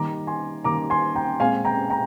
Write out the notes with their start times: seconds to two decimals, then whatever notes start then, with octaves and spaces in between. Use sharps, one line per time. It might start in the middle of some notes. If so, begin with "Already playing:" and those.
Already playing: D#3 G3 A#3 A#5 D6
0.27 G#5 C6
0.64 D#3 G3 A#3 A#5 D6
0.90 G#5 C6
1.15 G5 A#5
1.40 A#2 G#3 C4 F5 G#5
1.65 G5 A#5
1.90 G5 A#5